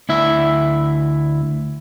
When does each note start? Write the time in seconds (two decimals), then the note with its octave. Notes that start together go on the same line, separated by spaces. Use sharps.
0.09 D2 E4 E5